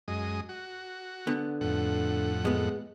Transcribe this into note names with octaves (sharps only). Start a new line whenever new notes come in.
F#2 G#3 D#5
F#4
D3 B3
F2 A2 F#5
G#3 B3